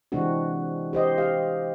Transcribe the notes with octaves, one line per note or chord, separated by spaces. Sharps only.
C3 E3 G#3 C4 D4 F#4
G4 C5 D#5
G4 F5